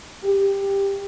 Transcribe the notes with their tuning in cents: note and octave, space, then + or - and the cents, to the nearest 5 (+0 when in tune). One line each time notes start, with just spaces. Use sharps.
G4 +10